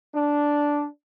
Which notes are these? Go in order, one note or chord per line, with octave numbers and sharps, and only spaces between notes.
D4